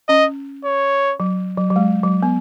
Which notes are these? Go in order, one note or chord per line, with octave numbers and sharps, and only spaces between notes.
C#4 D#5
C#5
F#3
F#3
F#3
G#3
F#3
B3